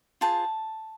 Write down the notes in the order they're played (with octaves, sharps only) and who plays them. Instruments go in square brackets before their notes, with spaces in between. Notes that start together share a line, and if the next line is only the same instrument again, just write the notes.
[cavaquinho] F4 G#4 C5 A5